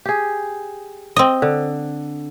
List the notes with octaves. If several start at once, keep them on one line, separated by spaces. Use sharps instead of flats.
G4 G#4
C4 D#5
D3